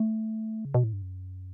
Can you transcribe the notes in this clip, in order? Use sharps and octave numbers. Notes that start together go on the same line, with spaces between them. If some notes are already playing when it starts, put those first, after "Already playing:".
Already playing: A3
C#3
B2
A2
G2
F#2